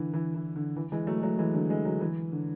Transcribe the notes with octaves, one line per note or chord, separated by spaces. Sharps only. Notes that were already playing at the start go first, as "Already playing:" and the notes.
Already playing: D3 E3
E3
E3
D3
E3
E3 G#3
F#3 A3
G#3
F#3 A3
E3 G#3
D3 F#3
E3 G#3
D3 F#3
E3
D3